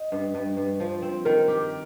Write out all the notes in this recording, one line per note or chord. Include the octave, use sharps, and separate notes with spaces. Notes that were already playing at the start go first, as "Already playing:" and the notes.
Already playing: D#5
G2
G2
G2
F3
C4
D#3 A#4
G4